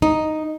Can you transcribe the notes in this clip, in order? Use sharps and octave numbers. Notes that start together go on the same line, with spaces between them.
D#4